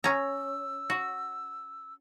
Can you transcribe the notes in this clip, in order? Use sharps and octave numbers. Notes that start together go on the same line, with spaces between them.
C#4 A#5 E6
F#4